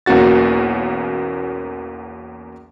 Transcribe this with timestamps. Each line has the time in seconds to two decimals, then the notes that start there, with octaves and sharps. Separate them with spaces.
0.06 B1 E2 A#3 C#4 F#4 A6